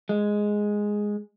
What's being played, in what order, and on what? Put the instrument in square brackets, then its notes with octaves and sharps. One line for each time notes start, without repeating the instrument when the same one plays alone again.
[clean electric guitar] G#3